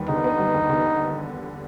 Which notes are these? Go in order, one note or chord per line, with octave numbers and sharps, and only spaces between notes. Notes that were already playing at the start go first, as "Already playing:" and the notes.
Already playing: D#2 G3 B3
D3 D#4
B3
G3
D#2
D3